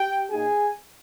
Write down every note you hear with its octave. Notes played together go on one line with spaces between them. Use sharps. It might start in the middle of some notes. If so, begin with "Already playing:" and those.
Already playing: G4 G5
A#2 A#3 D#4 G#4 G#5